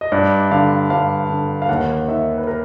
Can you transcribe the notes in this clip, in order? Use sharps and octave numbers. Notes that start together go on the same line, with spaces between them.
D#5
G2 D5
D3 F5
G2 F5
D3
F5
D#2 F#5
D#3 E5
B4
A#4